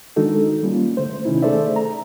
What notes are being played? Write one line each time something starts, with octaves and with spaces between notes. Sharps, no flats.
D#3 G#3 D4 D#4 F#4 A4
G3 A#3 C#4 F4
D3 A3 C5
C3 D#3 C#4 D#4 E4
A3 G#4 A4 C5 D5 E5
A#5